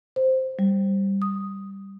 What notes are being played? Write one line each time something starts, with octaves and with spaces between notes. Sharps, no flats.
C5
G3
D#6